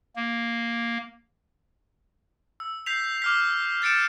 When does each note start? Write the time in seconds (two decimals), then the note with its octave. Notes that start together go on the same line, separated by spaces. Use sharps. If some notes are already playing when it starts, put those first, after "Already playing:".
0.16 A#3
2.60 E6
2.86 G6 B6 C7 F7
3.22 D6 F6 B6
3.82 G6 A6 C#7 D7 E7